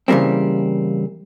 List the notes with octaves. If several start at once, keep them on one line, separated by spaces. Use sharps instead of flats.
C#3 E3 G3 A#3 C4